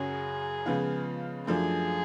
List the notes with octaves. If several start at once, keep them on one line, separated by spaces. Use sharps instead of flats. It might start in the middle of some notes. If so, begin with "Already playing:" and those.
Already playing: F#2 C#3 F#3 C#4 F#4 G#4
C#3 F3 G#3 B3 F4
F#2 F3 A3 D4 G#4